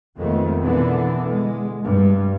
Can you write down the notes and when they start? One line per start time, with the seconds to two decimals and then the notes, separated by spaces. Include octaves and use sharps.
0.17 F2 D#3 G#3 A3 B3
0.63 B2 D3 E3 B3
1.29 G#3
1.84 G2